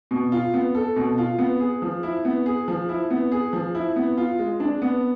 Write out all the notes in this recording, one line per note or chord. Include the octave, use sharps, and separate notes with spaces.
B2
F4
B3
A4
B2
F4
B3
G#4
F3
E4
B3
G#4
F3
E4
B3
G#4
F3
E4
B3
F4
G#3
D4
B3